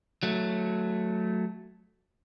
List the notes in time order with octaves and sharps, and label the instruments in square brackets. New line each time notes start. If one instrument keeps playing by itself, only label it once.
[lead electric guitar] F#3 A3